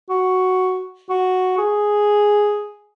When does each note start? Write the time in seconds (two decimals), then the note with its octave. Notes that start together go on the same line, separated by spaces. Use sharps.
0.10 F#4
1.09 F#4
1.58 G#4